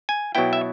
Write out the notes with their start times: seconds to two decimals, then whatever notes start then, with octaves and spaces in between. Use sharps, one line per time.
0.09 G#5
0.35 B2 F#3 B3 E4 G5
0.53 E5